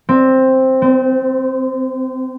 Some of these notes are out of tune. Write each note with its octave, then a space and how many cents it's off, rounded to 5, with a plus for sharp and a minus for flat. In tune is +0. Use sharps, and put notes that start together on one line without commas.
C4 +5
C4 -30